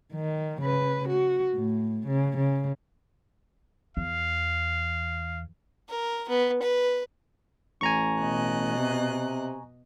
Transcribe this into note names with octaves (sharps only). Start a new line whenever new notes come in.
D#3
C#3 B4
F#4
A2
C#3
C#3
E2 F5
A#4
B3
B4
A1 G#5 A#5 C#6
B2 D#5 F#6
C3